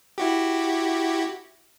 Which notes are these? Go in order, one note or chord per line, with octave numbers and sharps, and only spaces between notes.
E4 F#4 G4